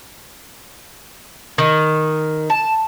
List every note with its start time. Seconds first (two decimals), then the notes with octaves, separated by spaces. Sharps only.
1.58 D#3
2.50 A5